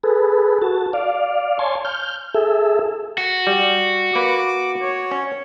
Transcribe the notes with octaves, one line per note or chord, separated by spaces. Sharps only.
G#4 A4 B4
F#4 A5
D5 F5
C#5 G#5 A5 C6
F6 G6
G#4 A4 E5
F#4
G3
A#3 B4 D6
C#5
C#4